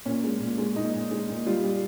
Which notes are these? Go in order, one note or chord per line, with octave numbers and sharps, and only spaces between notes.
A#2 C#4
G#3
A#2
G#3
A#2 D#4
A#2
G#3
A#2
G3 F4
G3